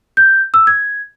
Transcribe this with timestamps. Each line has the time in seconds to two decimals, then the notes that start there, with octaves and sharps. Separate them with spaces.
0.17 G6
0.54 E6
0.67 G#6